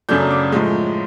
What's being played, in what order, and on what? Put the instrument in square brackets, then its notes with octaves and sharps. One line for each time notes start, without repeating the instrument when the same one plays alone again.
[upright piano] F#2 C#3 F#3 A3 D4 G6
D6
A2 F3 G#3